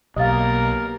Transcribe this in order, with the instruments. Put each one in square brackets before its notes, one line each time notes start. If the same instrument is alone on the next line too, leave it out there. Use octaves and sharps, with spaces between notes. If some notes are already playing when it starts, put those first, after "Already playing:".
[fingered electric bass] B1 [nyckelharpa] A#3 A#4 [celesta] G4 A6 [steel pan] D#5 F5